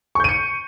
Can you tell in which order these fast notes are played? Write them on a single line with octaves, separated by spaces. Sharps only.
C#6 G6 D#7 C#7